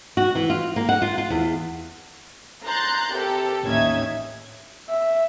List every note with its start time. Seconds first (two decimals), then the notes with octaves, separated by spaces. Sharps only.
0.17 F#4
0.35 E3
0.50 F4
0.76 A#3
0.89 F#5
1.02 F4
1.18 F4
1.30 E2
2.64 A#5 C6 F#6 G6 A6
3.15 C3 G4 A4 A#4
3.63 A1 D#2 C#4 D#4 E5 G#6
4.89 E5